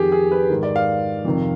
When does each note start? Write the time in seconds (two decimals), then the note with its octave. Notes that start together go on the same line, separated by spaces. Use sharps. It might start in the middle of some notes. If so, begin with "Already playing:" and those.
Already playing: F2 D#3 G4 G#4
0.12 G#4
0.32 B4
0.50 G#2 D#3
0.63 D5
0.76 F5
1.25 F2 C3 D#3